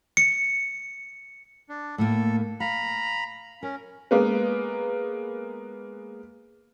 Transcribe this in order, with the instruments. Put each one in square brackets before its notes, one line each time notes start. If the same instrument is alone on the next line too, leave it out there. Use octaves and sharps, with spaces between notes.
[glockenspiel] C#7
[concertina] D4
[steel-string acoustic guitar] A2 A3 A#3 [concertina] A4
[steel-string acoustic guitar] F5 [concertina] A#5 B5
[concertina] C#4 [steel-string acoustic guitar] A#4
[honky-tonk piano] G#3 A#3 B3